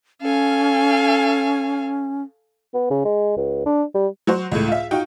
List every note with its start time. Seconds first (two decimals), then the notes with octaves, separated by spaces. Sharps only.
0.21 C#4 A4 F5 G#5
2.74 B3
2.90 C#3
3.05 G#3
3.37 C#2
3.66 D4
3.94 G3
4.27 F#3 F#4 C5
4.52 C#2 A2
4.68 F4 E5
4.91 D#4 F4 F#4 G5